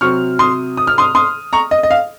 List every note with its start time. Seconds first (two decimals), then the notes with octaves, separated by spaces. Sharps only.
0.01 C3 F#3 C4 C#6 F6
0.39 C6 D#6
0.77 D#6
0.87 F6
0.98 C6 D#6
1.15 C6 D#6
1.53 A#5 C#6
1.71 D#5
1.83 D#5
1.91 F5